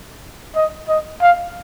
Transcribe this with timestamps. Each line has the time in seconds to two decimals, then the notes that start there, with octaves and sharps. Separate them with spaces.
0.56 D#5
0.89 D#5
1.22 F5